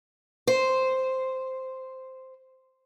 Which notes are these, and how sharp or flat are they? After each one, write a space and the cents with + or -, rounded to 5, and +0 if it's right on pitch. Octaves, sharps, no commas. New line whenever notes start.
C5 -5